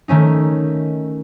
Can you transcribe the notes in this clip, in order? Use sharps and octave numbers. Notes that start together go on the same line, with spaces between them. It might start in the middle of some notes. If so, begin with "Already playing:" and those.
D#3 A3 C#4 D#4